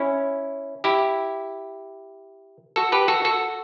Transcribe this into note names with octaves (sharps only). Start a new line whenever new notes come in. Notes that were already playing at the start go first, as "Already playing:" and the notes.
Already playing: C#4 E4
E4 G4
F#4 A4
G4 B4
F#4 A4
F#4 A4